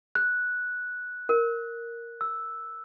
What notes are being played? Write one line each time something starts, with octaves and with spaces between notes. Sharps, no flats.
F#6
A#4
E6